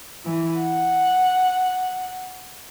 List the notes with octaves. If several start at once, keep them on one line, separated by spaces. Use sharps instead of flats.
E3
F#5